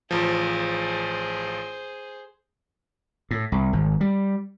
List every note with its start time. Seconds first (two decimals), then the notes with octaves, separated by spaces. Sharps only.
0.11 A1 F3 G#4 C5
3.31 A2
3.52 C2
3.73 G#1
4.01 G3